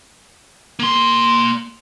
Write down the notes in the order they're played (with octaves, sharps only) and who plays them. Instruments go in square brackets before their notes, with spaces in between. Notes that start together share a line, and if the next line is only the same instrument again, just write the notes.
[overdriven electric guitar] A#3 C6